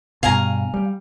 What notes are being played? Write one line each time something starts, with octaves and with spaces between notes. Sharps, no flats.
G2 B2 F5 G#5 A#5
G3